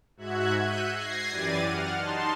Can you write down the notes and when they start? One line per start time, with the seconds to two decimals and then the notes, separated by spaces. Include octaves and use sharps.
0.17 G#2 F#4 E5 F#6 G#6
0.62 E6 F#6 G6 B6 C#7 D#7
0.92 G#6 A#6 C7
1.30 F#2 E3 G4 D5 A6 D#7
1.62 F#5 F6
1.94 D#4 A5 C6